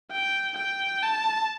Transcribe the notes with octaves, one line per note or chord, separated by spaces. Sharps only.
G5
G5
A5